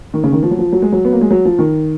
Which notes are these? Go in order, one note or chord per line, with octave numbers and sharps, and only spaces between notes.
D#3
C#3
D#3
F3
F#3
F3
F#3
G#3
F#3
B3
A#3
G#3
F#3
F3
D#3